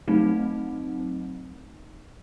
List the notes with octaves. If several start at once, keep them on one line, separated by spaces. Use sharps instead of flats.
F#3 A3 C4 D#4